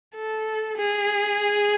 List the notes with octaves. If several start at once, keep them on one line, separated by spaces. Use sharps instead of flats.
A4
G#4